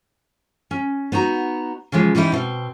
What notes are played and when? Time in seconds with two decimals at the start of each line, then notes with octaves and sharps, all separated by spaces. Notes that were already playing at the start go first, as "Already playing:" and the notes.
0.71 C#4
1.12 B3 D#4 F#4 A#5
1.92 C#3 E3 F3 G#3
2.15 E3 G3 C#4 D#4 E4
2.32 B2 C4